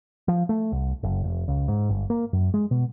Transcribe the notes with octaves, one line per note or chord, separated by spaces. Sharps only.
F3
A3
C2
F#1
F1
C#2
G#2
G1
A#3
F#2
G#3
B2